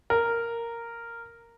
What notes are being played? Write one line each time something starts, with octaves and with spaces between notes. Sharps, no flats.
A#4